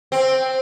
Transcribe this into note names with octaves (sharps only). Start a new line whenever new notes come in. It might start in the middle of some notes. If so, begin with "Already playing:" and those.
C4